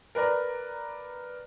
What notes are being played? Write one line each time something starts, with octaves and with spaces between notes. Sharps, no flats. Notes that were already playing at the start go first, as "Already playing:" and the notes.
A#4 B4 D5 A#5